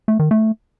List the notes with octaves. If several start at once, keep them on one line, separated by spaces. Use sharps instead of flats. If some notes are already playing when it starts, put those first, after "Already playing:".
A3
D#3
A3